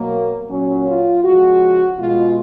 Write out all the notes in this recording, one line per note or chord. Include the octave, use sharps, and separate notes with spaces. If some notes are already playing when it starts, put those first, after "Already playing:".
Already playing: B2 F#3 A#3
A#2 F#3 C#4
F4
C#3 F3 G#3 F#4
B2 G#3 F4